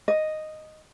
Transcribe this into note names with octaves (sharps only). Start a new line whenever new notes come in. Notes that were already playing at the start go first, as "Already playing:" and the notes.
D#5